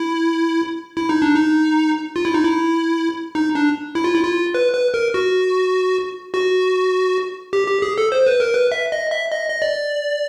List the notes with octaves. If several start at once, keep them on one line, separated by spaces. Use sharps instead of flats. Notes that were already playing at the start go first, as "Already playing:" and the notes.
Already playing: E4
E4
D#4
D4
D#4
F4
E4
D#4
E4
D#4
D4
E4
F4
E4
F4
B4
B4
A#4
F#4
F#4
G4
G4
G#4
A4
C5
B4
A#4
B4
E5
D#5
E5
D#5
D#5
D5